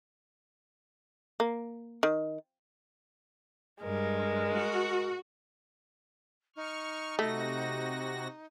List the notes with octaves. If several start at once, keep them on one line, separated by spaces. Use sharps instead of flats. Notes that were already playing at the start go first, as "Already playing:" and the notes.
A#3
D#3
G2 G#3 A#4
F#4
D#4 C#6 F6
C3 A3 F#4 A#6